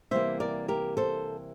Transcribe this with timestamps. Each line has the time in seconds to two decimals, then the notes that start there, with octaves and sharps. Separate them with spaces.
0.11 C3 E3 G3 A#3 C5 E5
0.40 A#4 D5
0.68 G4 A#4
0.97 A4 C5